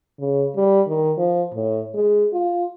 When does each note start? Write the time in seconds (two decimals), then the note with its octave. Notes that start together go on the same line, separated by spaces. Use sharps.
0.19 C#3
0.56 G3
0.88 D#3
1.18 F3
1.54 A2
1.94 G#3
2.33 F4